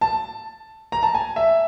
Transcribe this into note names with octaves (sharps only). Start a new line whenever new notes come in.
A5
A#5
A5
G#5
E5